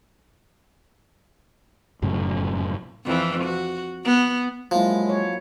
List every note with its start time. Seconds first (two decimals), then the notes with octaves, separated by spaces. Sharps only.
2.02 F1 F#2 A2 C#3
3.05 F2 E3
3.44 F#4
4.05 B3
4.71 F3 F#3 G#3 A#3 E4
5.09 C#5